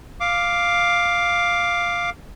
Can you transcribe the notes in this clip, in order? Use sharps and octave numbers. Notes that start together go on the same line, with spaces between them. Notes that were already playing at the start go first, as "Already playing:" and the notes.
F5 D6